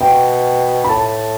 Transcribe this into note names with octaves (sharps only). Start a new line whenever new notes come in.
B2 G5
B5
A2 A5